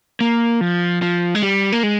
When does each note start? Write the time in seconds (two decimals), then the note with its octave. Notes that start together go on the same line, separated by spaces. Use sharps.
0.21 A#3
0.61 F3
1.02 F3
1.35 G#3
1.42 G3
1.72 A#3
1.83 G#3